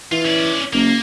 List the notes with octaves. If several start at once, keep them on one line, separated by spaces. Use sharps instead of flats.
E3 F4
C#4 D5
F#1 A#3